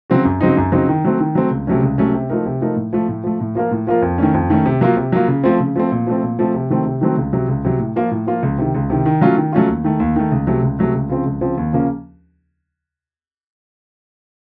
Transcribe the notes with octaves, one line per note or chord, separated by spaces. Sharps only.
C#3 F#3 C4 F#4
F#2
C#3 F#3 C4 D#4
F#2
C#3 F#3 C4 D#4
D#3
F#3 A3 C4
D#3
F#3 A3 C4
C#2
C3 F#3 A3 C#4
C#2
C3 F#3 A3 C#4
C3
F3 A3 D#4 A#4
C3
F3 A3 D#4 A#4
A2
F3 A3
A2
F3 A3
A2
F3 A#3 F4 A#4
A2
F3 A#3 F4 A#4
F2
D#3 A3 C#4
F2
D#3 A3 C#4
C3
F#3 A#3 F4
C3
F#3 A#3 F4
C#3
F3 A3 C4
C#3
F3 A3 C4
A#2
F3 A3 C4
A#2
F3 A3 C4
C3
D#3 F#3 A3 C4
C3
D#3 F#3 A3 C4
C#2
C3 F#3
C#2
C3 F#3
A2
F3 A#3 F4
A2
F3 A#3 F4
C#2
C3 D#3
C#2
C3 D#3
D#3
F#3 A3 C#4 F4
D#3
F#3 A3 C#4 F4
D#2
D#3 A3
D#2
D#3 A3
C#2
C3 F#3 A3
C#2
C3 F#3 A3
C#2
C#3 F3 C4
C#2
C#3 F3 C4
D#2
C#3 F3 A#3 C#4